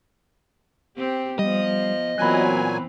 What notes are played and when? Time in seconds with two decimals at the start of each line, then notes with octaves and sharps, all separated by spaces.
0.97 C4 G4
1.39 F3 G3 B3 D#5
2.18 A#2 E3 F#3 B3 C4 G#5 B5 F#6